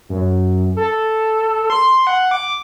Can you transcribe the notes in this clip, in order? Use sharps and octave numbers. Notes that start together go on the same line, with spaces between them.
F#2
A4
C6
F#5
D6